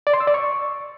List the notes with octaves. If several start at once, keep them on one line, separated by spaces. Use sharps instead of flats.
D5
C6
E6
D5
C#6